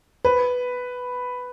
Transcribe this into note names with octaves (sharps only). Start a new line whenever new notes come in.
B4